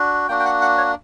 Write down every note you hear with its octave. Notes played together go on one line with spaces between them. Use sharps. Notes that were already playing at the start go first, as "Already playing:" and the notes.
Already playing: D4 F#4
A#3 D4 F#4 G5
G5
F#5
F#5
C#5